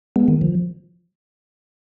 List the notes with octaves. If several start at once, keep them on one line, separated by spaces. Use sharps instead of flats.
G#3 B3
D#3
F3